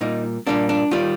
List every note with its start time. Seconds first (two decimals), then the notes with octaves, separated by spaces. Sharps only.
0.01 A#2 G3 A#3 D#4
0.47 A#2 G3 A#3 D4
0.69 D4
0.91 D#3 G3 F4